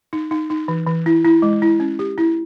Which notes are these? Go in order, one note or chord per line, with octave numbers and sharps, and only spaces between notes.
D#4
D#4
D#4
E3
E3
E4
E4
G#3
E4
C#4
G4
E4